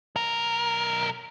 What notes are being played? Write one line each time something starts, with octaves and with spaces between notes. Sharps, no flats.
B1 A#4